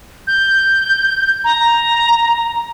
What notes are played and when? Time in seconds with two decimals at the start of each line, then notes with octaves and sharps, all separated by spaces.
0.27 G6
1.44 A#5